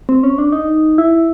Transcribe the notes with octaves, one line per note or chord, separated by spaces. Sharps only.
C4
C#4
D4
D#4
E4